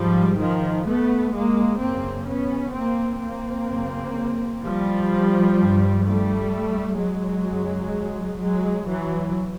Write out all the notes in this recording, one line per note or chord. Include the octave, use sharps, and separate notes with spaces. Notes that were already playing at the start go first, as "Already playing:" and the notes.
Already playing: G#2 F3 G3
D#3 F3
A3 B3
G#3 A#3
F#2 C#3 A#3 C4
B3 C#4
A#3 C4
A#3 C4
F#2 C#3
F3 G3
G2
G3 A3
F#3 G#3
F#2 C#3
F#3 G#3
E3 F#3